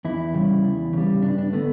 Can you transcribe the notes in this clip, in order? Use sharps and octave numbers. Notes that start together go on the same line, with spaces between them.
E2 E4
C#3 G3
E2
C#3 G3
G2 D4
D4
D3 A3 B3